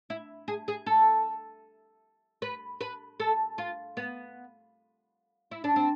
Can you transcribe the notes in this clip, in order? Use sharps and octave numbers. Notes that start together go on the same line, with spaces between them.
E4
G#4
G#4
A4
B4
B4
A4
F4
B3
E4
D4
C4